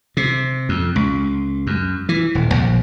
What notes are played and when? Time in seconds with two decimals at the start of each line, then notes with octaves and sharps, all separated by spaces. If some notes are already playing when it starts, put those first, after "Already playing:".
0.17 C3
0.69 F2
0.96 C#2
1.67 F#2
2.09 E3
2.35 D#1
2.54 A#1